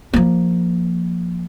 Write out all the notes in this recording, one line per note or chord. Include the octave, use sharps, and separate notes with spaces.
F3 A#3